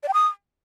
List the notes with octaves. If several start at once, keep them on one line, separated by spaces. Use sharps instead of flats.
D5
G5
D#6